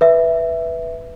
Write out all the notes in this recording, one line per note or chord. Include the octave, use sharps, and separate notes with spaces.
B4 E5